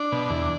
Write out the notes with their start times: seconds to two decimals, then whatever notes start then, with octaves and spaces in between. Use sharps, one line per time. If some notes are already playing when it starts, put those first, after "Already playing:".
Already playing: D4
0.12 B2
0.30 E2